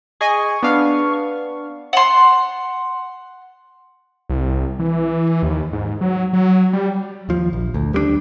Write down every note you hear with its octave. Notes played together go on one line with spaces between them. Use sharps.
G#4 D#5 G#5 C#6
B3 D4 F5
F#5 C6
C2
E3
D#2
G#2
F#3
F#3
G3
D#2 F3
A#1
D2
D#2 G3 G#3 D4